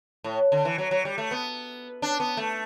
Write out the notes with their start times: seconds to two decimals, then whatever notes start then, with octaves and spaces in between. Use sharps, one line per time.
0.24 A2
0.52 D3
0.65 E3
0.78 F#3
0.91 F#3
1.05 G3
1.18 A3
1.31 B3
2.02 D4
2.20 B3
2.37 A3